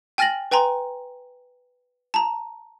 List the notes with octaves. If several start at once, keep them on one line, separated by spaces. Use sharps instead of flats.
G5 G#5 F6 A6 A#6 F#7
B4 G5 G#5 A#5 C6
A5 A#5